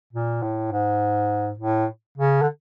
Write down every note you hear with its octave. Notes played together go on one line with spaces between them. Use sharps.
A#2
A2
G#2
A2
C#3
D3